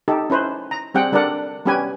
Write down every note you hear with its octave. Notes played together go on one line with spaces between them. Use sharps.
D#4 G4 A4
C#4 E4 B4 C5
A#5
G3 C4 G#4 F#5 G5
G3 D4 A4 A#4 D5 F#5
G3 B3 C#4 G4 B4 G#5